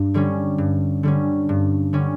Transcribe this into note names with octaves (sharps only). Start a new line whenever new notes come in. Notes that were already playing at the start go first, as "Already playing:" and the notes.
Already playing: G2
D3 G3 C#4
G2
D3 G3 C#4
G2
D3 G3 C#4